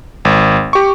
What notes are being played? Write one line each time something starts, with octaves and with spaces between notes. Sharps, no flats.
G#1
G4 C#6